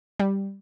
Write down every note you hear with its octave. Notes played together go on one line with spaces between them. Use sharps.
G3